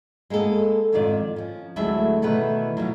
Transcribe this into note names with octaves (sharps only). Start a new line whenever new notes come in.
G#3 A#3 B3 A4
F2 G#2 D#3 F4 D5
F3 C#4
D2 F#3 G#3 E4 A4 E5
B2 D#3 E3 A3 B4
B2 F3 F#3